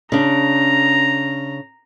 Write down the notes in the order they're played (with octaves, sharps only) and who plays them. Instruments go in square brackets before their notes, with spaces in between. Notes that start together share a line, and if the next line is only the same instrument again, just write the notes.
[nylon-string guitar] C#3 D4 [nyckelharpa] A#5